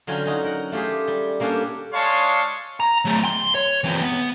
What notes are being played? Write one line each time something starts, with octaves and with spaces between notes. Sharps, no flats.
D3 F#3 C#4 F4 G5
C#4 D#4 F#4
A#4 F#5
A3 F4 G4 G#4
G3
G3 A#3 C#4 D4 G4 A4
G#3 D4 C#5 F5 A5 C6
A#5
F#3 A3
C6
C#5
E3 C4
B3